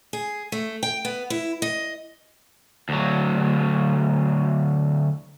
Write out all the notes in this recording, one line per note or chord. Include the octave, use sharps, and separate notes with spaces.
G#4
A3
G5
B3
E4
D#5
D2 F#3